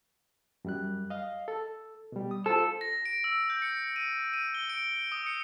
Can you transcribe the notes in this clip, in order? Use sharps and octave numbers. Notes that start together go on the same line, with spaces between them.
F#2 G3 F#6
D#5 F5
A4
B2 G3
D#6
F4 A4 C5
A#6
D7
E6
G6
C#7
D#7
D#7
G7
D7
D#6
C#7